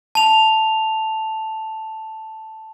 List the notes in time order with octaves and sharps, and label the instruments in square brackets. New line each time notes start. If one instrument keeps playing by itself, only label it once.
[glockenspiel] A5 F7